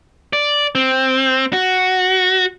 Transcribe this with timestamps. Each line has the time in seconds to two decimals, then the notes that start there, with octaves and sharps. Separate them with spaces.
0.33 D5
0.75 C4
1.53 F#4